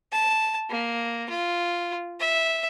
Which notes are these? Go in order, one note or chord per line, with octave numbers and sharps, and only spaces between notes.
A5
A#3
F4
E5